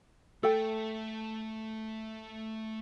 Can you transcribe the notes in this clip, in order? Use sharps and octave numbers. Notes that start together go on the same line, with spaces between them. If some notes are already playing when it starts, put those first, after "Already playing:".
A3 A4 G5